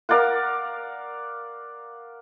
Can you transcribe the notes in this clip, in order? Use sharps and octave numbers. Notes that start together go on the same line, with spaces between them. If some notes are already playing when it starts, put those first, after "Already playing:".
A#4 D5 F5 F#5